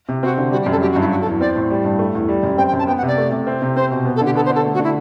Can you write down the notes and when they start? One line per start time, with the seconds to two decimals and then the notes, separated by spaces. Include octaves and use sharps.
0.09 C3
0.23 C4 F#4
0.38 D3
0.52 G3 F#4
0.62 G4
0.66 F#2
0.71 A4
0.81 F#3 G4
0.92 F#4
0.96 G2 E4
1.11 F#3 F#4
1.21 A4
1.26 E2
1.40 C4 D5
1.56 A2
1.70 G3
1.85 G2
1.99 A3
2.15 E2
2.29 G3
2.43 F#2
2.58 C4 G5
2.68 G5
2.73 F#2
2.79 A5
2.87 B3 G5
2.97 F#5
3.03 C3 D5
3.18 A3
3.31 C3
3.47 C4
3.62 C3
3.76 C4 C5
3.91 B2
4.05 B3
4.16 A4
4.21 D3 G4
4.35 B3 A4
4.46 C5
4.50 D3
4.55 A4
4.65 A3
4.74 F#4
4.79 D3 E4